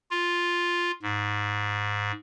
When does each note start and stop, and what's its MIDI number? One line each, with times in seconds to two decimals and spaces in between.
0.11 0.92 65
1.03 2.12 44